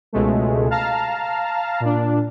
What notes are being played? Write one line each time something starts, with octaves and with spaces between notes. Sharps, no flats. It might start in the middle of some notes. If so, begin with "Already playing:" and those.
C#2 B2 G#3 A3
F5 A5 A#5 F6
A#2 D4